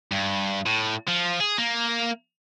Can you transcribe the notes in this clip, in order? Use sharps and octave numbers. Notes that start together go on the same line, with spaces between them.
G2
A2
F3
G#4
A#3